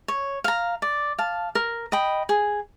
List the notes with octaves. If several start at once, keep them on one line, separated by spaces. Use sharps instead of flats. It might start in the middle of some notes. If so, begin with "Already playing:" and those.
C#5
F5 A#5
D5
F5 A5
A#4
D#5 G5 B5
G#4